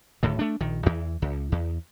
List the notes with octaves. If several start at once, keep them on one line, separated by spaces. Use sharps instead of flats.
D1 A2 D#3
A3 D4
A#1 D#3
E2 E3
C#2
E2